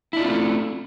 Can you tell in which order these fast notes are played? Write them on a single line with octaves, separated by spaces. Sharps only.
E4 D4 F4 C4 A3